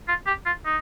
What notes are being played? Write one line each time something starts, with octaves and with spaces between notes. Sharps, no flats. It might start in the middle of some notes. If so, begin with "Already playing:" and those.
F4
G4
F4
D#4